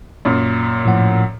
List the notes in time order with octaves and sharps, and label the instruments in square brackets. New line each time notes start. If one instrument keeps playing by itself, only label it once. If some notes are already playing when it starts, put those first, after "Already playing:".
[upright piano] F#2 A#2
[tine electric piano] A2 F3 F#5